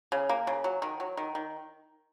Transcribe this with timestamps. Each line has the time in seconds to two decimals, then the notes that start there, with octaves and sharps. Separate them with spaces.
0.12 C#3
0.29 A#3
0.47 C#3
0.64 F#3
0.82 D#3
1.00 F#3
1.17 D#3
1.35 D#3